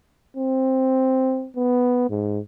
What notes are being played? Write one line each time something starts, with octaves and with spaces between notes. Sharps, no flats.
C4
B3
G#2